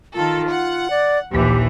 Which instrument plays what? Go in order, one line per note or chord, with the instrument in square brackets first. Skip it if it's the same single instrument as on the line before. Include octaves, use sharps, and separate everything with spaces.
[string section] D#3 A4 [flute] F4
[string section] F#5
[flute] D5
[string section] A#1 D#2 E3 [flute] G4